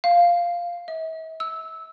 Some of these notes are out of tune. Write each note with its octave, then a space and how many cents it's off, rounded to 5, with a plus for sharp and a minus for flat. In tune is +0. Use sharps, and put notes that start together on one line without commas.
F5 -5
E5 -45
E6 -15